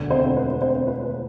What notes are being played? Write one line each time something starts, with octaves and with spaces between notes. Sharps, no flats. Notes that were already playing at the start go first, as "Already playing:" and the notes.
Already playing: E1 D2 D3
C4 C5
B4
C4 C5
B4
B4